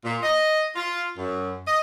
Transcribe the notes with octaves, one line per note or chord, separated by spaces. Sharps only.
A#2
D#5
F4
F#2
D#5